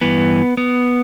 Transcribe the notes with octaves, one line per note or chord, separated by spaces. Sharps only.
G2 E3 B3
B3